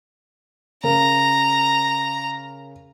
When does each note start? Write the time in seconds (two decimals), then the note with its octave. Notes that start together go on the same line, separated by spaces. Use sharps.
0.84 C#3 A#4 A#5